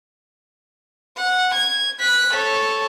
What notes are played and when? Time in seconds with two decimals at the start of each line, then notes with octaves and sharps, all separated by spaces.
1.17 F#5
1.55 G#6
2.00 F#6 B6
2.34 A4 C#5